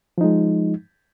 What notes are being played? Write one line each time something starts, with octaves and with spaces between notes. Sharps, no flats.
F3 G#3 D#4